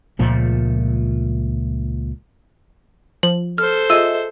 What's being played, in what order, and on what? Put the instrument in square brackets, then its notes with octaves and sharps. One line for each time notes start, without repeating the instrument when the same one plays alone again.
[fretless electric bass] C#2 A#2 F3 A3
[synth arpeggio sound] F3 [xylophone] F#7
[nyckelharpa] A4 C5 [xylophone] F6
[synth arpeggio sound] F4 G#4 [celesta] D#5 E5 [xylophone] E6 D#7